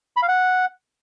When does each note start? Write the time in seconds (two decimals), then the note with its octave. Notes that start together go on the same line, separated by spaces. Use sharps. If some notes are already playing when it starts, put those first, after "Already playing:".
0.17 B5
0.22 F5
0.28 F#5